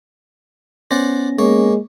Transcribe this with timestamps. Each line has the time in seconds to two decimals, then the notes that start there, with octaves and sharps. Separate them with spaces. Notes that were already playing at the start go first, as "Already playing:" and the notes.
0.91 B3 C#4 C5 D5 F#5 A#6
1.39 G#3 A#3 C#5